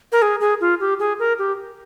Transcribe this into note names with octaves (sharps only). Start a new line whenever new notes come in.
A#4
G#4
G#4
F4
G4
G#4
A#4
G4